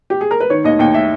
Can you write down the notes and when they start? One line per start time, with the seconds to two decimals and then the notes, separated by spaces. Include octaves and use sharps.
0.10 G4
0.21 G#4
0.31 A#4
0.40 B4
0.50 D#3 C#5
0.64 D#2 D#5
0.79 D#2 G5
0.94 E5